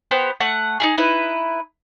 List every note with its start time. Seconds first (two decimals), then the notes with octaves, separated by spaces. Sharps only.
0.11 B3 G4 C5
0.40 A3 F#5
0.80 D#4 E4 G#4
0.98 D#4 E4 B4